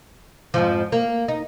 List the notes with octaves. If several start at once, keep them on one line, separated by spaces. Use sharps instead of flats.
F2 G#2 F3
A#3
D#4